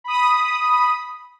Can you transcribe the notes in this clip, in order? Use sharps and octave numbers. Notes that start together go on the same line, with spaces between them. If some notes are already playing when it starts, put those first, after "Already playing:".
B5 D#6